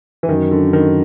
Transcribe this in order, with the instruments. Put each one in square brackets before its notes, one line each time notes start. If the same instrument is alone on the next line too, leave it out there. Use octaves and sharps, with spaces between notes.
[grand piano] E3
[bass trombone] F#2 [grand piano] D#3
[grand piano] D3
D#3